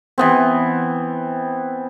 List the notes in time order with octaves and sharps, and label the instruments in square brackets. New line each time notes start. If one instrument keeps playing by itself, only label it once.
[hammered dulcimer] E3 B3 C4